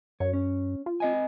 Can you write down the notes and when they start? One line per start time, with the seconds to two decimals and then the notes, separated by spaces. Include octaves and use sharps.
0.20 F#2 C#5
0.33 C#4
0.86 F4
1.00 C4 D#5 G#5